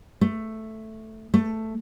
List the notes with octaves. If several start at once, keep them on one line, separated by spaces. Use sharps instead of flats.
A3
A3